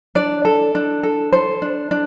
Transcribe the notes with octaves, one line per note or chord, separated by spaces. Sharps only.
D4 D5
A4
D4
A4
A4 C5
D4
D4